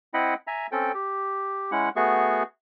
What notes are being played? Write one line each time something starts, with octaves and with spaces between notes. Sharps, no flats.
C4 E4 D#5 F#5 G5 B5
E5 G#5 A#5
C4 C#4 A4 G5
G4
G#3 C#4 E4 F#5
A3 B3 F#4 G#4 C#6